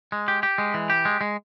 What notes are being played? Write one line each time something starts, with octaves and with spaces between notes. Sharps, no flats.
G#3
G4
G4
G#3
E3
G4
G#3
G#3